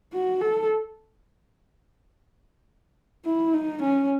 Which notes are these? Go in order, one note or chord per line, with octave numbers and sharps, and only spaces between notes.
F#4
A4
E4
D#4
C#4